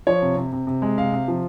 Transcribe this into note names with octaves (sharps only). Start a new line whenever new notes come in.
F3 C#5
C3
C3
C3
C3
G#3
C3 F5
C3
F3